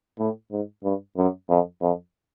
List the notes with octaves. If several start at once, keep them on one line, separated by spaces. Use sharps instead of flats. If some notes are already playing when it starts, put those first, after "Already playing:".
A2
G#2
G2
F#2
F2
F2